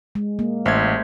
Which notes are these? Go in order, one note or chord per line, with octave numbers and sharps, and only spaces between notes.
G#3
A#3
A1 C5 E5 G#6